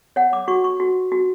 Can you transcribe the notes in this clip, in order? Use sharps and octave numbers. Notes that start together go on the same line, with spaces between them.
C#5 F#5
D6
F#4 C#6
C#6
F#4
F#4